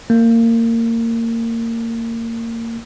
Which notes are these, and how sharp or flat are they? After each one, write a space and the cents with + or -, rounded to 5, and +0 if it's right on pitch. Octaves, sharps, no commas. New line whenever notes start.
A#3 -25